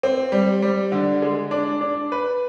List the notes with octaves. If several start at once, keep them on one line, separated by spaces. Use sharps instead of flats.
C4
G3
G3
D3
G#3
D4
D4
B4